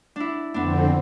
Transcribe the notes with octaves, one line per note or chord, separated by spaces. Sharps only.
D4 E4
F2 D3 B3 C4 D4